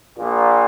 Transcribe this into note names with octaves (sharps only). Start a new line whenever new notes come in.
A#1 A#2